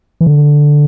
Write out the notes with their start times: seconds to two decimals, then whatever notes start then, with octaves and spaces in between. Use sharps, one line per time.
0.21 E3
0.26 D3